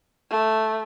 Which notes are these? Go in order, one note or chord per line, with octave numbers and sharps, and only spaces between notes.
A3